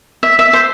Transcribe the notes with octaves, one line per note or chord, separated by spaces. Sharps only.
E5
E5
C5